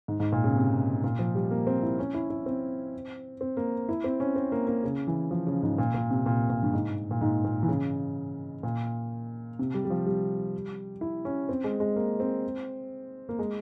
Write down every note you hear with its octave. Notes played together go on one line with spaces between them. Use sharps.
G#2
G#2
A#2
C#3
C3
A#2
F3
G3
A#3
C4
E4
C#4
E4
E4
C4
C4
A#3
E4
C4
C#4
C4
A#3
A#3
C#3
E3
F3
C#3
G#2
A#2
A#2
C3
A#2
A#2
G2
G#2
A#2
G#2
A#2
E3
C#3
A#2
C3
G3
G3
F3
G3
E4
C#4
C4
G#3
G#3
A#3
C4
A#3
G#3